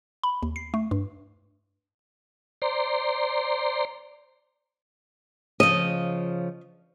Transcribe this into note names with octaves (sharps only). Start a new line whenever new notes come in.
B5
D#2
C7
A3
G2
C5 D5 A#5 C6
C#3 F3 D#5